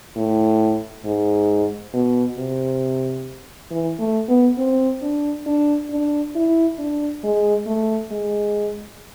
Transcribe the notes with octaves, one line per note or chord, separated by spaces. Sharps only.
A2
G#2
B2
C3
E3
A3
B3
C4
D4
D4
D4
E4
D4
G#3
A3
G#3